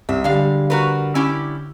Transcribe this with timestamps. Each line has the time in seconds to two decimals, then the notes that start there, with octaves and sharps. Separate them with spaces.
0.09 C2 E5
0.24 D3 G3 G#3 F5
0.70 F#4 A#4 B4
1.15 C#4 E4 G4